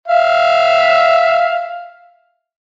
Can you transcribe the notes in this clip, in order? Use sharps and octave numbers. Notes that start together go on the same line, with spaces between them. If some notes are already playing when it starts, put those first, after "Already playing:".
E5 F5